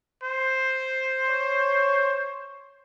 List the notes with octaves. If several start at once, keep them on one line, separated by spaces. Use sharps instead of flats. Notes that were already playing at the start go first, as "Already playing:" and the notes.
C5
C#5